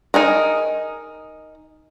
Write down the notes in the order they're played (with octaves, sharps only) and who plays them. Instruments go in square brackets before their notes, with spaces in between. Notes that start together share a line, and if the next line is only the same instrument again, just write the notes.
[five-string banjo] D#4 G#4 A#4